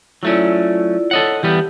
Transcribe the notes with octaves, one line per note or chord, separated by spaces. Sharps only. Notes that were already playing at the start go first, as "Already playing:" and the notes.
F#3 A3 C#4 E4 F4 D5
A4 C#5 D#5 F#5
E3 G3 B3 G4